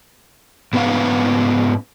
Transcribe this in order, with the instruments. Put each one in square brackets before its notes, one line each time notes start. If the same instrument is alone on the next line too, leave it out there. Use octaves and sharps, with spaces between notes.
[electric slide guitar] G#2 B3 C#4 B4 F5